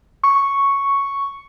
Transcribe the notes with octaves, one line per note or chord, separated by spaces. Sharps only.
C#6